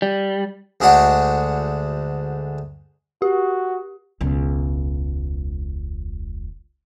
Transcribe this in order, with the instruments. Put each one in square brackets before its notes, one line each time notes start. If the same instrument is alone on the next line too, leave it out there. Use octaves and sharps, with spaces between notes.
[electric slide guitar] G3
[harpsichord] D2 G#3 D4 F#4 F#5
[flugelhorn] F#4 [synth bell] G4
[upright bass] E1 C#2